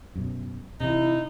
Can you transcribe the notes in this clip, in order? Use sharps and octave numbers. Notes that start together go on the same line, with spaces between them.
F#2 B2
C3 E3 D#4 E4